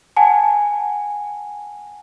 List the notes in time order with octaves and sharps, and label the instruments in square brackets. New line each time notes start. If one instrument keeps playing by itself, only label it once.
[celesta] F#5 G#5 A5